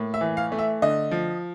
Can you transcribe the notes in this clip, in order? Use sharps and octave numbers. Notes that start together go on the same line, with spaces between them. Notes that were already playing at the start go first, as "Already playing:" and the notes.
Already playing: A2 A#3
E5
E3
F5
A3
E5
D3 D#5
F3